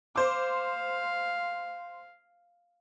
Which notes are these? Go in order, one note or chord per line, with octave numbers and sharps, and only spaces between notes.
C5 F5 D6